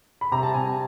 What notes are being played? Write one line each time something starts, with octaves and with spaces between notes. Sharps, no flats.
B5
C3 A#5
A5
C3 G#5